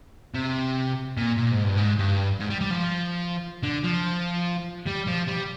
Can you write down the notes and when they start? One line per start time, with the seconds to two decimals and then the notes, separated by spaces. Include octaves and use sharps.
0.35 C3
1.17 A#2
1.37 A#2
1.51 G#2
1.64 G2
1.77 G#2
1.99 G2
2.40 G#2
2.50 G3
2.61 G3
2.71 F3
3.63 D3
3.83 F3
4.86 G3
5.07 F3
5.27 G3